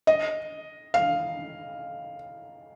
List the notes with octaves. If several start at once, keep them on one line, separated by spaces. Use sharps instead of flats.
D#5
F5